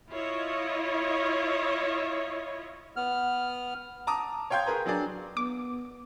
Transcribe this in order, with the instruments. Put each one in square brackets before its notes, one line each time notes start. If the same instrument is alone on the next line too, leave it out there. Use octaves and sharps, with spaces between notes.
[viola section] E4 F4 C#5 D#5
[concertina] B3 F6
[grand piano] A5 A#5 D6 D#6
C#5 F5 G5 C6 G6 G#6
G#4 A#4 B4 A#5
F#3 D4 G#4 D5
[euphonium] B3 [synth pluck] D6